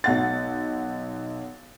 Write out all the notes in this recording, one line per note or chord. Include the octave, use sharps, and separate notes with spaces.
B1 F#5 A6